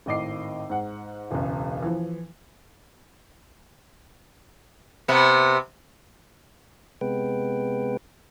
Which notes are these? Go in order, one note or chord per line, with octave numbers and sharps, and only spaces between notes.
G#1 A2 D#5 D6 C7
G#2 F#5
E1 C#2
E3 F3
C3 B3
C3 G#3 B3 B4 G5